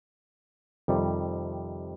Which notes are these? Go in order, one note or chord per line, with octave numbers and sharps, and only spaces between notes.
F2 C3 D#3 G3